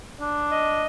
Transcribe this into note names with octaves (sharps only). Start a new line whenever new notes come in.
D4
D#5